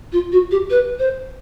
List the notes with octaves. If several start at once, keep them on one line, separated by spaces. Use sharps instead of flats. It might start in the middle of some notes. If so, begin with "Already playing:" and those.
F4
F#4
G4
B4
C5